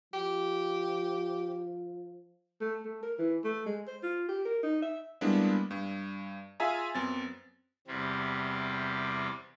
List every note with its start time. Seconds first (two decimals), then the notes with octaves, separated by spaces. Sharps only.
0.14 F3 G4
2.61 A3
2.85 A3
3.02 A#4
3.19 E3
3.44 A3
3.66 G#3
3.87 C5
4.03 F4
4.28 G4
4.45 A#4
4.63 D#4
4.82 E5
5.21 G3 G#3 A#3 B3 D4 E4
5.71 G2
6.60 F4 G#4 E5 F5 G#5 A#5
6.95 F#2 B3 C4 A6
7.87 E2 C3 G3 C4